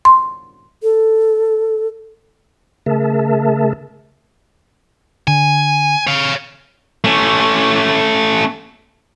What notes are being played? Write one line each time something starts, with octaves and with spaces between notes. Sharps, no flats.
C6
A4
C#3 A3 G#4 A#4 E5 A5
D3 G#5
C#5 F5
A3 C#4